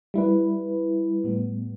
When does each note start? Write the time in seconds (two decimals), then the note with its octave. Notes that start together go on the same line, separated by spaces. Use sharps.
0.14 G3 E4 B4
1.24 A2 G3 B3